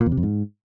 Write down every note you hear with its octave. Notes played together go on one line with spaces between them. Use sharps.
A#2
E2
C3
F2
G#2